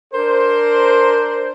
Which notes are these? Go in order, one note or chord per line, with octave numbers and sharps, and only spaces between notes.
D4 A#4 C5